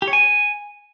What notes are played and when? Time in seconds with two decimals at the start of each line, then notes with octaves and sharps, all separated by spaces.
0.02 G4
0.08 C#5
0.13 G#5